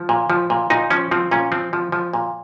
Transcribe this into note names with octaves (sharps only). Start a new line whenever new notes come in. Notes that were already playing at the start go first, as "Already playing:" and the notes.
Already playing: F3
A#2
F3
A#2
A#2 D#4
F3 C#4
F3 C4
A#2 C#4
F3 C4
F3
F3
A#2